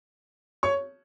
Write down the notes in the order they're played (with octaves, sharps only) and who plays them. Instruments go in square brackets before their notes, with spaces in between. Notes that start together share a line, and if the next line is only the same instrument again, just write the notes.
[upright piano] C#5 C#6